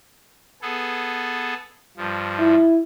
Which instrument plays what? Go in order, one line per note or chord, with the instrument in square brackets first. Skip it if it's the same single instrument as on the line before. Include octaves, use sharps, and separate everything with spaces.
[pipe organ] B3 G#4 A4
G2 F3
[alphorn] E4